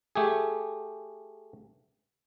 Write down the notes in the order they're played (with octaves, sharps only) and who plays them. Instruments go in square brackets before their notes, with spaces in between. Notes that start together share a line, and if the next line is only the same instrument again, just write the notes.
[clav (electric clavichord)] A3 G4 G#4